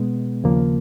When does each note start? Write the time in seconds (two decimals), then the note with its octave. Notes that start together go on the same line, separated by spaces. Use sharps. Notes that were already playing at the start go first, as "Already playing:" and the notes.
Already playing: B2 G#3 B3
0.44 D#2 C#3 F3 A#3